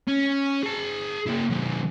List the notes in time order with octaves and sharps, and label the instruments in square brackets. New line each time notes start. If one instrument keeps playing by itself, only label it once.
[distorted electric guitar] C#4
G#4 A5
A#3 E4
D#3 F#3